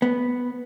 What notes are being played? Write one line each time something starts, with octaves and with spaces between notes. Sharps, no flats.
B3